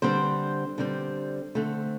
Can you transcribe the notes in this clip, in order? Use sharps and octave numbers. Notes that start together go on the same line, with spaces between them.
D3 G3 C4 C5
D3 G3 C4
D3 A3 C4